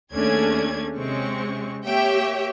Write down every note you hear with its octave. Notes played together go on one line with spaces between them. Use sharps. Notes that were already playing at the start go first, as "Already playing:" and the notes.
D#2 A3 C#4 D4 G#4 G#6
C3 G#3 C4 C#4 C#6
A#3 G4 C#5 E5 G5